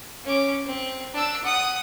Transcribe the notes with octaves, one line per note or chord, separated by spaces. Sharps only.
C#4 D6
C4
D4 E6
F#5 D#6